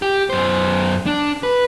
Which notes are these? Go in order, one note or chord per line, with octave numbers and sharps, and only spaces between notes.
G4
F#2 C5
D4
B4